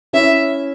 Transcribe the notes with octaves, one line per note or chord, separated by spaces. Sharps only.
C#4 E4 E5